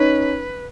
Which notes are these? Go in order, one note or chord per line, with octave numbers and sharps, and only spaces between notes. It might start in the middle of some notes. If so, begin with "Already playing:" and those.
Already playing: C#4 D#4 B4